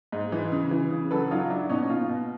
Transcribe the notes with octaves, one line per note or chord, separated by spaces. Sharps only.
G#2
E3
C#3
E3
C#3
F#3 A4 B4
F#3 D#4 F4
F#3 D4 E4
B2 C#4 D#4
B2 D#4 F4
B2